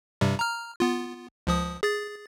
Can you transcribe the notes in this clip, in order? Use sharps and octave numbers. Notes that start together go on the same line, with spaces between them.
G2 C3 G3
A#5 F6
B3 F4
C#2 F3 D#6
G#4 A6